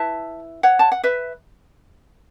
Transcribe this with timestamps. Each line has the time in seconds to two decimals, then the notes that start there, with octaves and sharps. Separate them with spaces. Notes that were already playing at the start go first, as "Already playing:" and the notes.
Already playing: E4 B4 E5 A5
0.63 C#5 F#5
0.79 A5
0.92 F#5
1.04 B4 E5